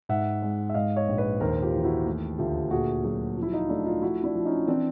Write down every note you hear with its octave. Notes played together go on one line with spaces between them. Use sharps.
G#2 E5 F#5
G#3
E5
G#2 D#5 F5
C#5 D#5
A#1
B4 C#5
D#2 A#4 C5
F4 G4
E3
E4 F#4
A3
D2 F4 G4
A#2 F#4 G#4
F#3 F#4 G#4
F3
E4
D#4 F4
A3 D4 E4
D#4 F4
F3 E4 F#4
D4 E4
F3
C#4 D#4
E3 C4 D4